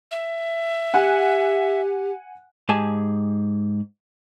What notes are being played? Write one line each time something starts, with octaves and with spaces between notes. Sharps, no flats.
E5
G4 F#5 G#5 F#6
G#2 G4 G#4 G#5 A5